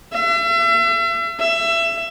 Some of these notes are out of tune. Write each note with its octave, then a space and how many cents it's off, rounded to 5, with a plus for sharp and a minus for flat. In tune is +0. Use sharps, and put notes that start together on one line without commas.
E5 +40
E5 +25